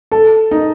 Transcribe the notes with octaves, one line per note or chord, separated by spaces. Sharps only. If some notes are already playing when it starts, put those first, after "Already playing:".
A4
D#4